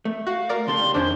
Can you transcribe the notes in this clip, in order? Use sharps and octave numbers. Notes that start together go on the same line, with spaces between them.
A3
F#4 F5
A#4 D5
D#2 C#3 A4 C6
B1 G3
F2 D#3 C#4 D4 C5 G#5